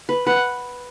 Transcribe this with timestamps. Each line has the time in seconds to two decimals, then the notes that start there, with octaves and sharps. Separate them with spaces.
0.09 B4
0.27 B4 F#5